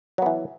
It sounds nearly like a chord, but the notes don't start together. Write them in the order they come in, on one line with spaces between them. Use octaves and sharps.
F#3 B3 E3